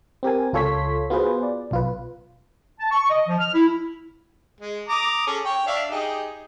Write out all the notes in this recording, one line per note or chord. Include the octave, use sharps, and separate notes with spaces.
C4 G4 A#4 G#5
C#2 F4 A4 C#5 C6 B6
B3 F4 F#4 G#4 B4 C5
D5
B1 F4 B4
A5
C#6
D#5
F3
F6
E4
G#3
A#5 D6 D#6
C#4 G#4 A4
C#5 G5
D4 E5 F5
D#4 G4 G#4